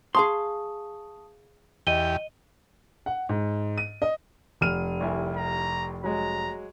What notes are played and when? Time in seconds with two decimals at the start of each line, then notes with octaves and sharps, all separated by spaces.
0.15 G#4 F5 A5 C6 C#6 D#6
1.87 E2 G4 D#5 D#7 G7
3.06 F#5
3.29 G#2
3.78 D#7
4.02 D#5
4.61 F1 F6 D#7
5.00 C2 E4 G#5
5.37 A#5
6.04 F#3 G#3 A#5